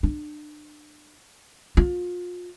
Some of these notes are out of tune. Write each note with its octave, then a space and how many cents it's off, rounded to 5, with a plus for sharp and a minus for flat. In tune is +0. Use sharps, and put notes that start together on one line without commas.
D4 +35
F4 +30